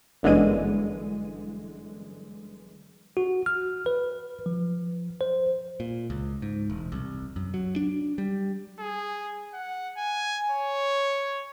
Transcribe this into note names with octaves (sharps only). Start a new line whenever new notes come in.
G1 F#2 D3 E3 G#3 D#7
F#4
F6
B4
F3
C5
A#2
C#2
G#2
E1
C2
F#2
F#3
D4
G3
G#4
F#5
G#5
C#5